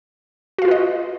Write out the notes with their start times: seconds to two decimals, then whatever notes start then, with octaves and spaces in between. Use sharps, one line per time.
0.58 F#4
0.62 F5
0.65 F4
0.68 B4
0.71 D#5